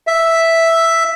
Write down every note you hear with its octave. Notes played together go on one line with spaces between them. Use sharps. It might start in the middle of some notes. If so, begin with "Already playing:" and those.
E5